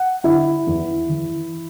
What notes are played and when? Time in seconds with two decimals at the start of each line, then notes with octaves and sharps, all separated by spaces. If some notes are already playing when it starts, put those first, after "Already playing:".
Already playing: F#5
0.24 D3 E4
0.67 E2
1.09 E3